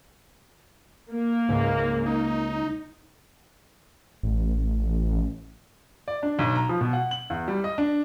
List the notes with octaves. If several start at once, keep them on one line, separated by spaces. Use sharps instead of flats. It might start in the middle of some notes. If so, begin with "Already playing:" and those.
A#3
C#2 G#2
D#4
A1
D5
D4
B1
A#5
F3
B2
F#5
F#7
E2
G3
D#5
D4